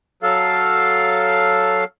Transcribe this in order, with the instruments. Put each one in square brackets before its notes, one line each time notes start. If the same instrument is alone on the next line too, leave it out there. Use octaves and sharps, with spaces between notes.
[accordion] F#3 A4 F5